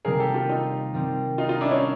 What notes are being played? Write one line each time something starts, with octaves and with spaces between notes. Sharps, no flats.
C3 D#3 G3 A#3 G#4 A#4
G4 A4
F4 G4
D#4 F4
D#3 G3 C4
D#4 F4
D#4 F4
D4 E4
C#4 D#4